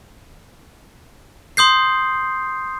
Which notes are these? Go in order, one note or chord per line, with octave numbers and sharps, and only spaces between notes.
C6 D#6 G6 C7